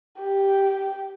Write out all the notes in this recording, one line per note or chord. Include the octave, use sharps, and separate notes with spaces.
G4